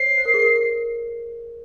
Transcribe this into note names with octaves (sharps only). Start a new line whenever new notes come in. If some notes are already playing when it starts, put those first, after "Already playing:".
Already playing: C5 C#5 C7
C5
A#4
G#4
A#4